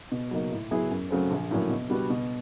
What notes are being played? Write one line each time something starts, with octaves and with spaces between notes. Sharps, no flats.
B2
F#3 A#3 D#4
A2
F#3 B3 E4 G#4
F#2
C#3 F#3 A3 C4
A#1
A2 F#3 A#3 C#4
B2
G3 B3 D4 F#4
B2